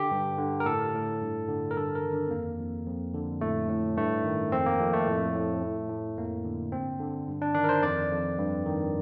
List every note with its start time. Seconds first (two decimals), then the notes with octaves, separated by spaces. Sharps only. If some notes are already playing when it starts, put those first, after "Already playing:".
Already playing: D3 G4
0.11 G2
0.38 D3
0.60 A#4
0.65 A2 A4
0.94 A2
1.21 G2
1.48 D3
1.71 A#4
1.76 G2 A4
1.95 A#4
2.03 D#3
2.13 D4
2.27 C4
2.31 F2 A#3
2.58 F2
2.87 F2
3.14 D3
3.41 A2 A3
3.69 A2
3.97 G2 A3
4.24 D#3
4.52 F2 C4
4.66 A#3
4.80 F2
4.93 A3
5.07 A2
5.35 A2
5.62 A2
5.90 A2
6.17 F2 A#3
6.45 D3
6.72 G2 C4
7.00 D3
7.28 G2
7.42 D4
7.55 D#3 D4
7.64 A#4
7.69 C5
7.82 F2 D5
8.11 F2
8.38 G2
8.66 D#3